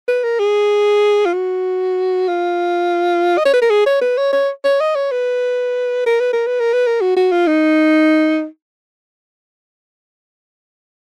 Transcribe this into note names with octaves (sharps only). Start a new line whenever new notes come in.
B4
A#4
G#4
F4
F#4
F4
D#5
C#5
B4
A#4
G#4
C#5
B4
C#5
C#5
C#5
D#5
C#5
B4
A#4
B4
A#4
B4
A#4
B4
A#4
F#4
F#4
F4
D#4